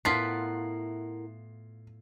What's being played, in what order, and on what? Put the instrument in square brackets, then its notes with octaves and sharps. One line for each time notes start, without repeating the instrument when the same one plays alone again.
[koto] A2 B3 F4 [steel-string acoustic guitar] E4 A#4 F#5 [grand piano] C7